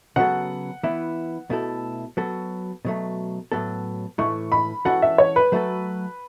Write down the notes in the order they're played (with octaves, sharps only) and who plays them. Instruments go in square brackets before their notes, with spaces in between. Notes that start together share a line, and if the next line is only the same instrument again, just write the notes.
[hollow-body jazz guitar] C#3 F#3 B3 F#4 A4 [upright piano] F#5
[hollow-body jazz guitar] E3 B3 E4
B2 A3 E4 A4
F#3 B3 F#4 A4
B2 F#3 A3
A2 F#3 B3 A4
[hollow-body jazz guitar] A2 E3 A3 [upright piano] C#6
[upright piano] B5
[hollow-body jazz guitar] E3 C#4 F#4 A4 [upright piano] F#5
[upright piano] E5
C#5
B4
[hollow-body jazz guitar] F#3 A3 F#4 A4